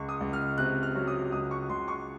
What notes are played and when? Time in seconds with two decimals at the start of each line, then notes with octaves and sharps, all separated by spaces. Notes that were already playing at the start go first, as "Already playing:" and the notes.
Already playing: C#2 C#6
0.09 D#6
0.21 C#2
0.33 F6
0.58 C3 F#6
0.83 F6
0.95 F#3
1.07 D#6
1.32 C#2 D#6
1.51 C#6
1.69 C#2 C6
1.88 C#6